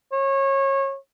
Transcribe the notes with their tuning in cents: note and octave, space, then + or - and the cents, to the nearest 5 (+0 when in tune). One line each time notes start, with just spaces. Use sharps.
C#5 -25